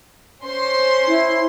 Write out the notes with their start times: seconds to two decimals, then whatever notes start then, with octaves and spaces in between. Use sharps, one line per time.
0.43 C#4 C5 C6
1.07 E4